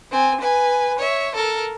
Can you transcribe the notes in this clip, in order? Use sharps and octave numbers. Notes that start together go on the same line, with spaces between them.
C4 G#5
B4 G#5
C#5 E5
A4 A#4